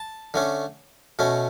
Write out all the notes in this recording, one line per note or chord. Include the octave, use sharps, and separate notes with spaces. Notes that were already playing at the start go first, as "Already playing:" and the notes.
Already playing: A5
D3 A3 C#4
B2 A3 C#4